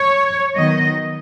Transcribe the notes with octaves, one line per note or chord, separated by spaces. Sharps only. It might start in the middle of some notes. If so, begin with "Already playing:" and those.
Already playing: C#5
D#3 F#3 B3 D#5